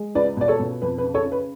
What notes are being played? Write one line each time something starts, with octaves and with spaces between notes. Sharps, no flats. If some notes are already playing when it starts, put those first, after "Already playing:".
Already playing: G#3
C#2 B4 D5
B2 D5
A4 C#5
B2
F2 B4
B4
C#3
A4 C#5
C#3
B4